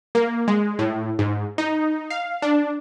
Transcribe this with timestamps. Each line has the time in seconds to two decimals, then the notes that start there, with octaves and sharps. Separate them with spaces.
0.15 A#3
0.48 G#3
0.79 A2
1.19 G#2
1.58 D#4
2.10 F5
2.42 D4